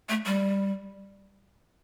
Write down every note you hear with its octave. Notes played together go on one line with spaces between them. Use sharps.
A3
G3